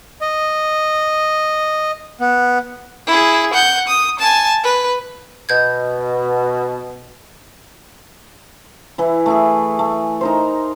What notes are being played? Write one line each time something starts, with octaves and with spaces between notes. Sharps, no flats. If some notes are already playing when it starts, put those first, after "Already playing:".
D#5
B3
E4 G#4
F#5 G6
D#6
G#5 A5
B4
B2 D#5 G6 G#6
E3 E4
A3 E4 G#4
A3
D#4 A#4 C5